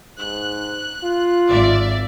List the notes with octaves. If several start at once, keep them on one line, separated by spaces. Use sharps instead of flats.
G#2 F#6
F4
G#1 D5 E5